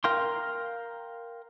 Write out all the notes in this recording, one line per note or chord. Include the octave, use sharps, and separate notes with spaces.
A#4 F5 G5 C6